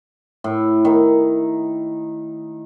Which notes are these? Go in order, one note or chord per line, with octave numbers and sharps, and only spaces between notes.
A2
D#3